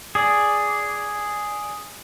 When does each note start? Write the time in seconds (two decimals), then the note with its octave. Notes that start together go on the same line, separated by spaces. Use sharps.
0.15 G#4 D5